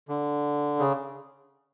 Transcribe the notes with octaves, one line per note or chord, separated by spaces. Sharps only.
D3
C#3